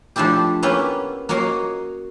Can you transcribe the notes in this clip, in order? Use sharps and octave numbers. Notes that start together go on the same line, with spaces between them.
F3 A3 D4 E4 G4
A#3 B3 C#4 E4 G4 B4
A#3 F#4 C#5 D#5 F5 A#5